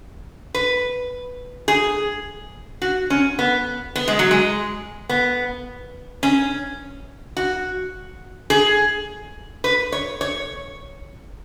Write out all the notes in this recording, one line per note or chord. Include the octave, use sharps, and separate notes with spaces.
B4
G#4
F#4
C#4
B3
B3
G#3
F#3
G#3
B3
C#4
F#4
G#4
B4
C#5
C#5